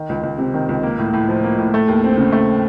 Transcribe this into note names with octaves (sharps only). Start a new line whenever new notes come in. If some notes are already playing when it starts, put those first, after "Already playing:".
Already playing: D#3
C#2
C#2
C3
D#3
C#2
A#3
A2
A2
F3
A#3
A2
A3
D#2
C4
C#3
A3